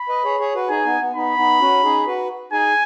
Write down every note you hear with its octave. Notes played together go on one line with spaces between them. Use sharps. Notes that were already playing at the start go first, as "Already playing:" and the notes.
Already playing: B5
B4 D#5
G#4 C#5
G#4 C#5
F#4 B4
D#4 G#4 G#5
B3 D#4
B3
B3 D#4 B5
B3 D#4
C#4 F#4
D#4 G#4
F#4 B4
D#4 G#4 G#5